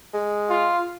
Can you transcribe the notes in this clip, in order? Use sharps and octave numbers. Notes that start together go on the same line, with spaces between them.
G#3
F4